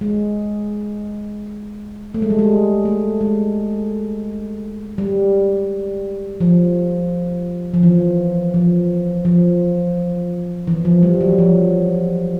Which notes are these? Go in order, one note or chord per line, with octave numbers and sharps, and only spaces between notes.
G#3
A3
G#3
G3
G#3
A3
G#3
G3
F3
F3
E3
F3
F3
E3
F3
G3
F#3
F3